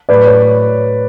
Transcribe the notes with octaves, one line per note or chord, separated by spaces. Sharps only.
A2 F#3 B4 D5
C#5